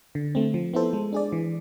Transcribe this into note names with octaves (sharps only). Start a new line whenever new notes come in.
D3
A3 C4
F3
B3 E4 A4 C5
G#3
D4 G#4 D5
E3